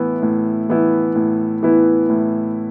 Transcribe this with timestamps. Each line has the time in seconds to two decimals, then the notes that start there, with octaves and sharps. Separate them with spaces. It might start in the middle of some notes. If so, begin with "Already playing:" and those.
Already playing: A2 E3 B3 E4
0.22 A2
0.69 E3 B3 E4
1.15 A2
1.63 E3 B3 E4
2.10 A2